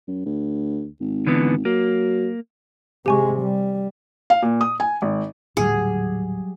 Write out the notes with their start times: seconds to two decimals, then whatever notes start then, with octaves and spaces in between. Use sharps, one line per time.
0.07 F#2
0.26 D2
1.00 G#1
1.27 D3 E3 B3
1.65 F#3 A#3
3.06 C3 G#3 G4 G#5 C#6
3.41 G3
4.30 F5
4.42 A#2
4.61 D#6
4.80 G#5
5.02 G#1
5.57 D#1 A2 D3 F#3 G3 G#4